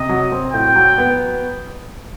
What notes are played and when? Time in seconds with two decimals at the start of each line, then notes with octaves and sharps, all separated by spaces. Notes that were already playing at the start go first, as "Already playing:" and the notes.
Already playing: C3 D#5
0.09 F#3
0.32 C4
0.53 A2 G5
0.76 F#3
0.98 B3